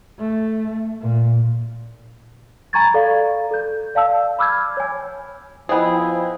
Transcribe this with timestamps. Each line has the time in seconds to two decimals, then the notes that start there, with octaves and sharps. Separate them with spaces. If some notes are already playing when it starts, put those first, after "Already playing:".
0.19 A3
1.01 A#2
2.73 G#5 A#5 B5 C#6 G#6 A6
2.94 A4 D5 F5
3.51 A4 G6
3.95 D5 F5 A5 E6
4.39 B5 D6 E6 F6 G6 G#6
4.77 C#5 G#5
5.69 F3 B3 E4 G#4 C5 D#5 G5